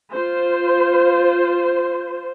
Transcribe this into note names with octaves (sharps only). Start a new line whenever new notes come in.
F4 C5